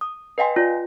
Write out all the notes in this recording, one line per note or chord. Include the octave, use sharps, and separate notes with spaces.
D#6
B4 D#5 F5 G5 G#5 C6
F4 D5